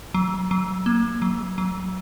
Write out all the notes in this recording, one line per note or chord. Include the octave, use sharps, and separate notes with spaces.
F#3
F#3
A#3
F#3
F#3